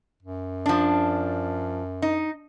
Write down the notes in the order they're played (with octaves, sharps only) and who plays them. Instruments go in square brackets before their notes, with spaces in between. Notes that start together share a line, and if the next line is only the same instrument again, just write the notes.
[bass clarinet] F#2
[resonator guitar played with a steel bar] F3 D4
D#4